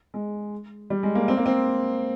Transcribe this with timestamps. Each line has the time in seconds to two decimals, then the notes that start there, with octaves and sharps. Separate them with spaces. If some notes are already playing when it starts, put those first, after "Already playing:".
0.14 G#3
0.90 G3
1.03 G#3
1.15 A#3
1.28 C4
1.37 A#3
1.46 C4